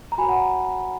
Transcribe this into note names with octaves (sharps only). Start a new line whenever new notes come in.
A#5
F#4 A#4 C#5 G#5 B5
F#5 A#5